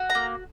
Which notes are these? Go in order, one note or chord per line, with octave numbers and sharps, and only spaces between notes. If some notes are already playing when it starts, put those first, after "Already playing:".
Already playing: F#4
A#5
A#3